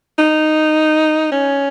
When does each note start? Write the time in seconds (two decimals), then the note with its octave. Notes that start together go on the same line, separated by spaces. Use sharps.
0.19 D#4
1.32 C#4